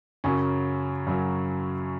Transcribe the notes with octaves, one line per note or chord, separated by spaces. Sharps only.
F#2 C#3 F#3 C#4
F#2 C#3 F#3